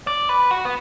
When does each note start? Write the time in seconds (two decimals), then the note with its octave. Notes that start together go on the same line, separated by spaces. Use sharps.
0.07 D5
0.29 B4
0.51 F#4
0.65 B3